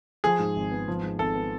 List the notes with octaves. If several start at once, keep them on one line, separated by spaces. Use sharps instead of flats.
F3 G#4
G#2
G#1
B3
F3
G#2
G#1 A4
B3